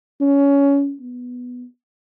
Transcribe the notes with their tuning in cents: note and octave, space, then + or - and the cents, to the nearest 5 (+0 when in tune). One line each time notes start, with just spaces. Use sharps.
C#4 +20
B3 +0